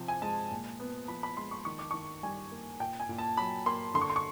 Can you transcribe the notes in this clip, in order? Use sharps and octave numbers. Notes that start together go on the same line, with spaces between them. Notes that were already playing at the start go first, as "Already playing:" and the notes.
Already playing: C3 F3 C4
G#5
G#3 A5
A#2
B3
F3 B5
B5
G#3 C6
C#6
D#3 C#6
D6
D#3 C#6
G3 G#5
A#3
A#2 G5
G#5
A#2
A5
F#3 B5
A#3 C6
D3 C6
C#6
C6
C#6